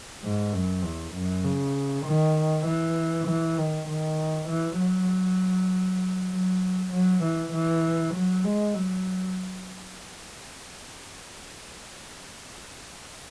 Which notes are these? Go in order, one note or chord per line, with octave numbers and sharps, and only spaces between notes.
G#2
F#2
E2
F#2
C#3
D#3
E3
E3
D#3
D#3
E3
F#3
F#3
F#3
E3
E3
F#3
G#3
F#3